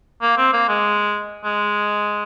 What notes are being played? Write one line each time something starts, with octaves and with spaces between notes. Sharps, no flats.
A#3
C4
A#3
G#3
G#3